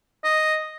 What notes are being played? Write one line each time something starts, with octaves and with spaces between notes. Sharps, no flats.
D#5